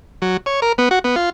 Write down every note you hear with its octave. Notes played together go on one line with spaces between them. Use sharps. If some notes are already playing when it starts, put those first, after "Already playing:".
F#3
C#5
A#4
B3
F#4
B3
F4